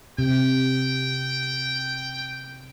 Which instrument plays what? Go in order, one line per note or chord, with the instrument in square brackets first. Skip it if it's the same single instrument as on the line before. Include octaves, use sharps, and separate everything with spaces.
[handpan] C3 [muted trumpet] G5